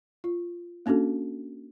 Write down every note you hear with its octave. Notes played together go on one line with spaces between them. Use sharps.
F4
A#3 C#4 D4 F#4 A4